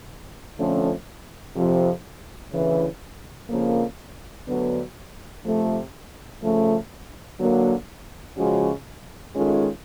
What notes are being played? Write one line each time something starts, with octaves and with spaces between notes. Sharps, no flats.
F2 D3 F3 A3 C#4
F2 C3 F3
D2 C#3 E3
F2 C#3 F3 A#3
D2 D3 F#3 B3
C3 F3 A3
C#3 F3 A3
D3 F#3 A#3
C#3 F3 G#3 C#4 F#4
D#3 G#3 C#4 F4 A4